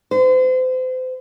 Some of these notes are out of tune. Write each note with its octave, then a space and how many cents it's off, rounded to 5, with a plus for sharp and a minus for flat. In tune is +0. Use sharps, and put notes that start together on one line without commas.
C5 -35